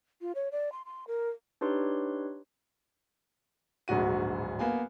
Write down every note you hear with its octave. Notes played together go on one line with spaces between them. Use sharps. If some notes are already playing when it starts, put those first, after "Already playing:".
F4
C#5
D5
C6
C6
A#4
D4 D#4 G4 B4 C#5 C6
D1 A#1 G#2 F#4 D#7
A#3 B3 G#5